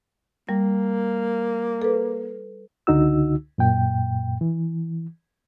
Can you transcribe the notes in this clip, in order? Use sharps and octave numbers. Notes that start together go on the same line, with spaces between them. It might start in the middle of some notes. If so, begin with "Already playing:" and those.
G3 A#3
A4 B4
C#2 D3 D#4 F#4 E6
F#2 A#2 G5
E3